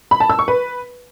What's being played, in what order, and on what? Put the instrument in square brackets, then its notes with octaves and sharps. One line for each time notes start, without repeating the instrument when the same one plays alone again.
[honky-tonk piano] B5
A5
E6
C#6
B4